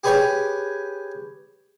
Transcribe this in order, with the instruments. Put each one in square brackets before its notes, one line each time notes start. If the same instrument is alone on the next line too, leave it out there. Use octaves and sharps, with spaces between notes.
[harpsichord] G4 G#4 B4 C#5 G5 G#5